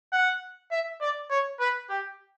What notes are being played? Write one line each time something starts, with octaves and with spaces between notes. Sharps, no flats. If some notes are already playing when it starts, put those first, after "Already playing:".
F#5
E5
D5
C#5
B4
G4